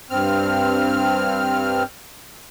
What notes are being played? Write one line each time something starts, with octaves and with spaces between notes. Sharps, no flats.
G2 C4 F6